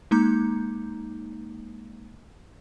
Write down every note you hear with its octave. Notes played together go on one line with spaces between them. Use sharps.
G#3 A#3 D#4 A#5 D6 G6